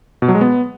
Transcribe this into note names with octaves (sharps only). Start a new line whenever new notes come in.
B2
F#3
G#3
B3